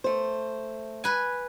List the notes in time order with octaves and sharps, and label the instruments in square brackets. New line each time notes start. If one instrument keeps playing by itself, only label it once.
[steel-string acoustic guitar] A3 C5
[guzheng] B4 G#5